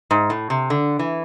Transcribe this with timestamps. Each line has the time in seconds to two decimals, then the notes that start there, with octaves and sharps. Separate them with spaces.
0.11 G#2
0.30 A2
0.50 C3
0.70 D3
0.99 E3